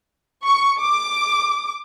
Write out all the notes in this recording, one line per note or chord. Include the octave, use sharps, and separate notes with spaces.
C#6
D6